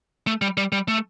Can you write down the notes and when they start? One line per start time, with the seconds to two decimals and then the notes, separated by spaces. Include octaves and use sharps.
0.27 A3
0.42 G3
0.57 G3
0.72 G3
0.88 A3